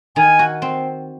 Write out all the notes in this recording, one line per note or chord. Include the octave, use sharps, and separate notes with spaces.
D#3 G#5
F#4
C4